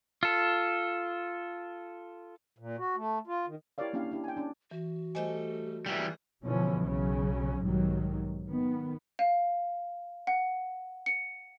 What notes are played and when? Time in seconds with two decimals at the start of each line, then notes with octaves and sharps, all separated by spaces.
0.23 F4 A4
2.58 A#2
2.78 F#4
2.96 A3
3.27 F4
3.47 D#3
3.78 E4 G4 A#4 C#5 D5 F5
3.93 A#3 C#4 D4 E4 G4 F5
4.11 D4 E4 G4
4.24 G5 G#5
4.37 C#4 D4
4.71 E3 F#4
5.15 G3 A3 A4 C5 D#5 G#5
5.86 E3 G3 G#4
6.44 B2 D3 E3 F3 C#4
6.83 B1 C#3 F#3 C#4
7.62 B1 G#2 D#3 F#3 G3
8.47 D#3 B3
9.19 F5
10.27 F#5
11.06 C#7